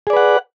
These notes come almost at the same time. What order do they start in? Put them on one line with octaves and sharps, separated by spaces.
G#4 D5 B4 F#5